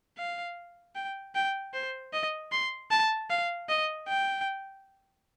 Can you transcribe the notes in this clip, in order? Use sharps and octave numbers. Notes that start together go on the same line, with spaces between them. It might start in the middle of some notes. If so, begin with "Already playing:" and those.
F5
G5
G5
C5
D#5
C6
A5
F5
D#5
G5